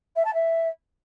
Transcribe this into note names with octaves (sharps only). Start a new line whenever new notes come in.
E5
A5
E5